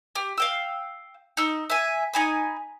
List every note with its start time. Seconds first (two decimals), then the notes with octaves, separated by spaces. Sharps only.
0.16 G4
0.38 F5 G5 E6
1.37 D#4 E6
1.70 E5 G#5
2.14 D#4 G#5 B5